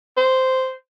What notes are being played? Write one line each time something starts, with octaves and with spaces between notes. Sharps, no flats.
C5